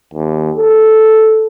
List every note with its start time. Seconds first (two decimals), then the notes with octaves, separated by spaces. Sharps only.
0.13 D#2
0.56 A4